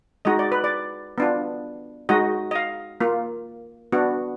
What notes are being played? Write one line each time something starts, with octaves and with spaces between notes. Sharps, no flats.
G#3 D#4 F#4 D#5
D5
B4
D5
B3 D4 F4
G#3 D#4 F#4 D#5
D#5
F5
A#3 F4
B3 D4 F#4